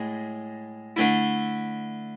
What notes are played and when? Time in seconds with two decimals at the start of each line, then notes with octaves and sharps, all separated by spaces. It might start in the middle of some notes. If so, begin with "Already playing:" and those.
Already playing: A2 G#3
0.96 D3 A3 E4